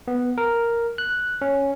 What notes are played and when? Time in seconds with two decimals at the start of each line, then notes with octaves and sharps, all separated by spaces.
0.08 B3
0.38 A#4
0.98 F#6
1.42 C#4